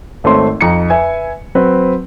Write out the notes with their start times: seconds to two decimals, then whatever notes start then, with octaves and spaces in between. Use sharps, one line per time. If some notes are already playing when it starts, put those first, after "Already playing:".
0.24 G#1 A3 C4 C#5 C6
0.61 F2 D#4 A#5 C#7
0.90 B4 E5 G#5
1.55 F#3 C4 B4